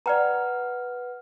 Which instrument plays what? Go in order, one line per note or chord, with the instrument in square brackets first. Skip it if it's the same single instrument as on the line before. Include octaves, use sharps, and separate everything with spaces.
[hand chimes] B4 F#5 F6 [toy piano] D5 G5 A#5